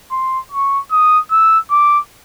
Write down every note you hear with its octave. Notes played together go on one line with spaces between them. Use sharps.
C6
C#6
D#6
E6
D6